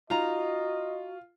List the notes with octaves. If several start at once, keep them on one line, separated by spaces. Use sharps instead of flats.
D#4 F4 F#4 D#5 A#5